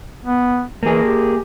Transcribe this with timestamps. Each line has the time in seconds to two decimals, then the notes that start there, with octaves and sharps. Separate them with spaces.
0.26 B3
0.83 E3 A#3 G#4
1.04 G4